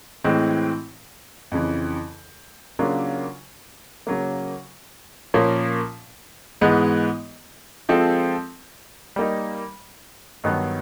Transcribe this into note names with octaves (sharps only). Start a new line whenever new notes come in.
A2 E3 G#3 C4
F2 C#3 E3
C#3 F#3 A#3 D4 F4
C#3 F#3 A#3
A#2 F3 A#3 C#4
G#2 E3 G#3 B3
F3 G#3 C4 F4 A4
G3 A#3 D#4
G2 D#3 F#3 B3